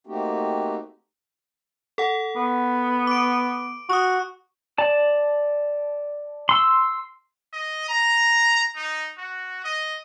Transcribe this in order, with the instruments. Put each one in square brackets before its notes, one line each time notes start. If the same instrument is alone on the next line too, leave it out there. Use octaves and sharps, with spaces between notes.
[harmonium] A3 A#3 C4 D#4 F#4 G4
[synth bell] A4 F#5
[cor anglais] B3
[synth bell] D6 D7
[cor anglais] F#4 [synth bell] C#6 D#6
[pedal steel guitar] D5 A5
C6 E6
[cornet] D#5
A#5
D#4
F#4
D#5